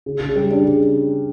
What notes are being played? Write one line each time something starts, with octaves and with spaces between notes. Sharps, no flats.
C#3
C#3
G3
D4
C#3